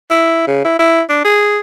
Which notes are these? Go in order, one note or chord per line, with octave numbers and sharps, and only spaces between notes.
E4
C#3
E4
E4
D4
G#4